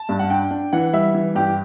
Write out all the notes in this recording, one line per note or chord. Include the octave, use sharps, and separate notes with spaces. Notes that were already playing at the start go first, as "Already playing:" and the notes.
Already playing: A5
G2
F#5
D4 G5
D4
E3 F#5
G3 E5
E3
G2 G4